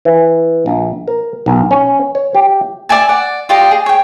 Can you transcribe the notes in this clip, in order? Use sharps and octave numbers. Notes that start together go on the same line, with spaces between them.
E3
A#1
A#4
B1
C#4
C#5
G4
D5 E5 G#5 A5
D5 F#5
F4 G4 D5 D#5
G#4
C#5 G5